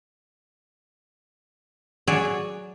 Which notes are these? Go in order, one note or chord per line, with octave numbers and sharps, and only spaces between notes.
F#3 G#4 C#5 D5